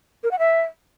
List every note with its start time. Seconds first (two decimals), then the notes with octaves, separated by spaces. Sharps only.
0.23 A#4
0.31 F#5
0.39 E5